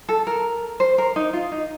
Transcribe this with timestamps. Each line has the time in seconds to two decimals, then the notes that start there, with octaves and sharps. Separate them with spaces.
0.09 A4
0.27 A#4
0.80 C5
0.98 A#4
1.16 D#4
1.33 F4
1.52 D#4